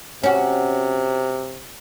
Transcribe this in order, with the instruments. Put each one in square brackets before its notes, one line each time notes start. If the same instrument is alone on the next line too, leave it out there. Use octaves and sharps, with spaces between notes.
[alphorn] C3 [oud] C#4 F#4